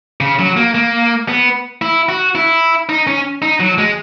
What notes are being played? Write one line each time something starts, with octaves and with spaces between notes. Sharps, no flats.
C#3
F#3
A#3
A#3
B3
E4
F#4
E4
D#4
C#4
D#4
F#3
G#3